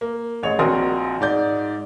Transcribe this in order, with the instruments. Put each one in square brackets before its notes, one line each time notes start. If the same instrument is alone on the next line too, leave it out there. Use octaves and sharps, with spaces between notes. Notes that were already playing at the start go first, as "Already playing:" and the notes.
[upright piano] A#3
A1 G#3 C#5 F7
A#1 C4 F#4 A#4 C6 D#6
G#2 D5 G6